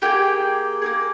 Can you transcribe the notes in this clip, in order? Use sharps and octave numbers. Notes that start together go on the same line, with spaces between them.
A#3 D#4 G4 G#4 G5
A#3 D#4 G#4